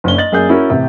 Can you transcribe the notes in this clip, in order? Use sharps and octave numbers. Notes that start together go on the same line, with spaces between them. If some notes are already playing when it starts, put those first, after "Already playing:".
F#1 C#4 D4 G7
D#5 A6 F#7
F#2 A#3 G#4 D5 G6
C#4 E4 F#4 A#4
A1 C3